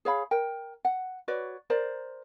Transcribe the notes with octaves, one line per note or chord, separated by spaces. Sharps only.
G#4 C#5 F5 B5
A#4 G5
F#5
F#4 B4 C#5 D5
A#4 C5 D5 A#5